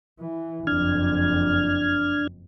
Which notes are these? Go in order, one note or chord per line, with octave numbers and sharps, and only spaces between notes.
E3
F#1 F2 D4 F6 G#6